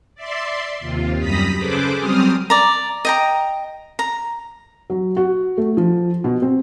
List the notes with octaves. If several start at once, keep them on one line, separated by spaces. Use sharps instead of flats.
D5 E5 C6
D#2 C3 F4
F#2 G3 A#5 B5 D#6 B6
C#3 G#4 A4 B4 C5 D6
F#3 G3 C4 D#6 F6
D5 A#5
D#5 G5 A#5
A#5
F#3
F#4
A3
F3
B2
C4